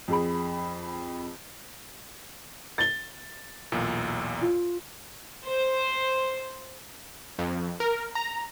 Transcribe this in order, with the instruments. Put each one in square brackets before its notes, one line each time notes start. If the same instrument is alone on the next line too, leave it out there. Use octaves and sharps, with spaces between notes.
[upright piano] F2 G#4 B5
A6 G7
[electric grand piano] B1 E2 A#2
[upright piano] F4
[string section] C5
[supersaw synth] F2
A#4
A#5